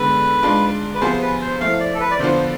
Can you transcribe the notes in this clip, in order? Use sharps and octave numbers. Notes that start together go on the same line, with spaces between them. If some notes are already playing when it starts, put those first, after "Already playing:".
Already playing: D3 G#3 B3 B4
G#2 G#3 D4 F4
B4
C3 F3 B3 F4 G#4 C5
B4
C5
F3 A3 E4 F5
D5
A4
B4
D5
D3 F3 B3 D4 F4 C5